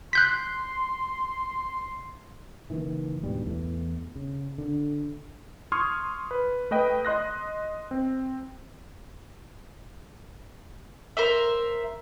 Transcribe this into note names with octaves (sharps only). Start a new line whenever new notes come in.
C6 F#6 G6 B6
F#1 D#3 E3
D2 G#2 B2 G3
E2 E3 A3
C#3
D3
C6 C#6 D#6 F6 G#6
B4
A3 B4 D#5 G5
D#5 C6 F#6 A#6
C4
A#4 C5 E5